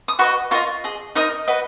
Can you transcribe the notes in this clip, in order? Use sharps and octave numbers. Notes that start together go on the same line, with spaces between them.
D#6
F#4 B4 D#5 C#6
F4 A#4 D#5 C#6
G#4 D#5
D#4 A#4 D#5 D#6
F#4 B4 D#5